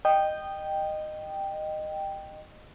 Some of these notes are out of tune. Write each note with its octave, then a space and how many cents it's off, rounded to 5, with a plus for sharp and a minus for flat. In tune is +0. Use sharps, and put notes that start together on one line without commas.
D#5 -15 G5 +0